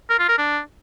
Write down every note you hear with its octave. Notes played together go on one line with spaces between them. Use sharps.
A#4
F4
A#4
D4